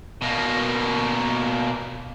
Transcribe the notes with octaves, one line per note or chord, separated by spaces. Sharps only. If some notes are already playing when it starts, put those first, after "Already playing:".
B2 A#3